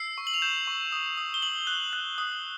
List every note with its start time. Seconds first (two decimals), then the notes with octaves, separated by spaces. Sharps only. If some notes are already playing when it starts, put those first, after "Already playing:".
Already playing: E6 C7
0.18 C#6
0.27 F#7
0.34 F7
0.42 G6 E7
0.67 C#6
0.92 D#6
1.17 D#6
1.34 G7
1.42 D#6 F#7
1.67 F#6
1.93 F#6
2.18 D#6